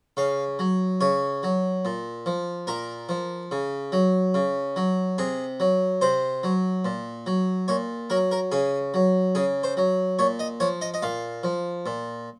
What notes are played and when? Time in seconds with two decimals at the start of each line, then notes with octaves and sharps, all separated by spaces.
0.17 C#3 F5
0.59 F#3
1.01 C#3 C#5
1.43 F#3
1.85 A#2
2.26 F3
2.67 A#2 A#4
3.09 F3
3.51 C#3
3.92 F#3
4.34 C#3
4.76 F#3
5.18 C3 G#4
5.60 F#3
6.01 C3 C5
6.43 F#3
6.85 A#2
7.26 F#3
7.68 A#2 C#5
8.10 F#3 A#4
8.31 A#4
8.52 C#3 G#4
8.94 F#3
9.35 C#3 G#4
9.63 C5
9.77 F#3
10.19 A#2 C#5
10.39 D#5
10.60 F3 C#5
10.81 D#5
10.94 D#5
11.02 A#2 F5
11.43 F3
11.86 A#2